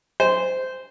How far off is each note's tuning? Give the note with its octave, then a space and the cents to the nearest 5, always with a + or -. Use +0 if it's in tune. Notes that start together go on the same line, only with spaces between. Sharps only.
C5 -15